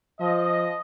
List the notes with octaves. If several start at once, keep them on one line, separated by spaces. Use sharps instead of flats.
F3 D#5